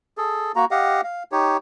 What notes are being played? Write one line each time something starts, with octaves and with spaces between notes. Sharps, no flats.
G#4 A4
A#3 F#4 A#5
G4 D#5 F5 F#5
F5
D#4 G4 C#5